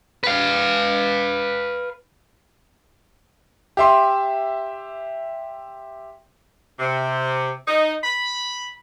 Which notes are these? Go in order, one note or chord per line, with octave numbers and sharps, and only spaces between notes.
B4 F5
G4 E5 C6
C3
D#4
B5